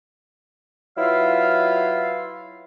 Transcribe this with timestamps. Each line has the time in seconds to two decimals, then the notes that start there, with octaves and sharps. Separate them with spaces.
0.98 F#3 E4 F4 B4 E5 F5